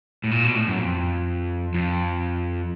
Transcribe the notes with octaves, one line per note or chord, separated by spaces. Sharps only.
A2
A#2
B2
A2
F#2
F2
F2